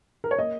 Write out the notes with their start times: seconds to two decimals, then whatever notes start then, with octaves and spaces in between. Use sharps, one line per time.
0.24 A#4
0.31 C#5
0.38 A#3 D#5